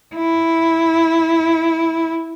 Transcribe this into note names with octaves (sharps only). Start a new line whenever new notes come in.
E4